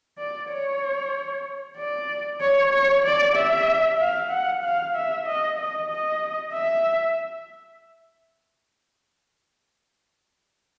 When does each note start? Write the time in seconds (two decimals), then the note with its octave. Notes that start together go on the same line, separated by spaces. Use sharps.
0.18 D5
0.51 C#5
1.77 D5
2.41 C#5
2.72 C#5
3.05 D5
3.36 E5
4.00 F5
4.31 F#5
4.64 F5
4.95 E5
5.26 D#5
5.58 D#5
5.90 D#5
6.54 E5